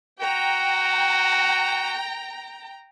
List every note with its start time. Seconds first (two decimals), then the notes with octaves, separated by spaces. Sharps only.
0.20 F#4 G5 A#5